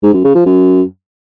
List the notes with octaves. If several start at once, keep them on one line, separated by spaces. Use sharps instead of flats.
G#2
F#2
C#3
F3
F#2